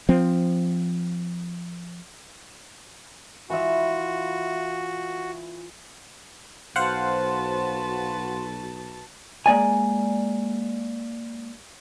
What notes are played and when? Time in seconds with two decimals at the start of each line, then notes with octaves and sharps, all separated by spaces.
0.09 F3 C4
3.50 E3 F4 F#4 E5
6.76 B1 F#4 B4 C5 F5 F#5 A5 C6
9.46 G#3 A#3 D5 G#5